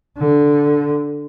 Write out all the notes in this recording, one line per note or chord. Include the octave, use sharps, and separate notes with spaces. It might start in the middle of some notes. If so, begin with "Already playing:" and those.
D3